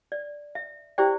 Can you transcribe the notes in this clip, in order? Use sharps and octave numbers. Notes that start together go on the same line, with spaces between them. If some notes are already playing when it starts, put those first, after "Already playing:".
D5
E5
E4 G4 C5 D5 G5